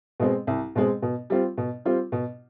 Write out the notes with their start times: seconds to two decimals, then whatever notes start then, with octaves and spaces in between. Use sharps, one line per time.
0.20 B2 G#3 C4
0.47 C2
0.76 B2 G#3 C4
1.02 B2
1.30 G3 C4 F4
1.58 B2
1.85 G3 C4 F4
2.12 B2